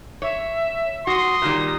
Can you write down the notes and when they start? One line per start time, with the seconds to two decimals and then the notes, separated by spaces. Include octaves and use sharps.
0.22 C#5 E5
1.07 F#4 C6 D#6
1.42 A#2 D#3 G3